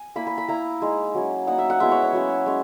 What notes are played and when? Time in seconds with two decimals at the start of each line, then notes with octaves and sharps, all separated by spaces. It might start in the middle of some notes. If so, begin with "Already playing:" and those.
Already playing: G#5
0.16 A#3 E4 B5
0.27 B5
0.38 B5
0.48 A#3 E4 A#5
0.82 G#3 D#4
1.14 F#3 C#4 E4
1.47 A#3 D#4 F#5
1.58 E5
1.70 F#5
1.80 G#3 B3 E4 E5
1.92 C#5
2.03 C#5
2.13 F#3 A#3 C#4
2.46 G#3 C#4